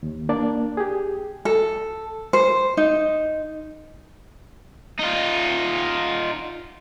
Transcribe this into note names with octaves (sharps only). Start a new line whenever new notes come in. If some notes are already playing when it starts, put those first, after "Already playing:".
D#2
A#3 D4 D5
G4 G#4
A4
C5
D#4
D#4 F4